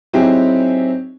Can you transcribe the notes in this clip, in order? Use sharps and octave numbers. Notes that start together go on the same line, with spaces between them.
F#3 C4 D#4 E4 G4 G#4